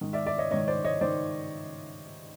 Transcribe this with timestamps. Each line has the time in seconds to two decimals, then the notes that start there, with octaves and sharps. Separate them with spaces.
0.01 G#2 D#3
0.13 D5 E5
0.26 D5 E5
0.38 C#5 D#5
0.51 G#2 D#3 C#5 D#5
0.68 C5 D5
0.84 C#5 D#5
1.01 D#3 C5 D5